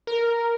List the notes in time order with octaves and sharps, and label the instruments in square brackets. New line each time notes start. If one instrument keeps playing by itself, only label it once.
[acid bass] A#4